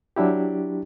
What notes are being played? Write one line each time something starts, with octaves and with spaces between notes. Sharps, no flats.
F#3 D4 E4 G4